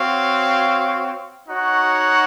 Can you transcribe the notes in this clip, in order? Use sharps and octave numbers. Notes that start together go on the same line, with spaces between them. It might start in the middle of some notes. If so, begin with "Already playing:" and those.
Already playing: C4 F#4 C#5 F5
D#4 F#4 C#5 F#5